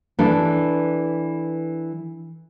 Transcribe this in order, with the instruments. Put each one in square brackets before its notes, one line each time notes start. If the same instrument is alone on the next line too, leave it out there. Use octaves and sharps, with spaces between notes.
[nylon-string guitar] E3 D4 A4